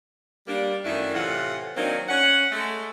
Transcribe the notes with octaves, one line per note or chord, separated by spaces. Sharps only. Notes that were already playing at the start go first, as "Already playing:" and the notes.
G3 A#3 D4
F#2 D#3 A3 D4 E4
A2 C3 E3 F4 F#5
D#3 F#3 A#3 C4 D4 D#4
C#4 F#5
G#3 A3 A4